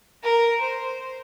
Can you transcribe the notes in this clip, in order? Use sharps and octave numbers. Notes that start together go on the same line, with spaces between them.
A#4 A#5
C5